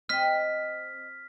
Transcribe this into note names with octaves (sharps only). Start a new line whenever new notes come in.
C4 D#5 F6 B6